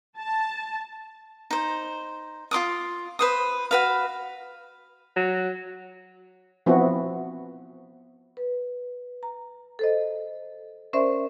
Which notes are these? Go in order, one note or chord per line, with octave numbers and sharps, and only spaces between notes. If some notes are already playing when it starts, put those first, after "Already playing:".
A5
D#4 C5
F4 C6 D6 D#6
B4 C5 D#6
F#4 B4 F5
F#3
F3 B3 C4 E4 F#4
B4
A#5
A4 C5 D#5
C#4 A#4 C5 D5 E5 C6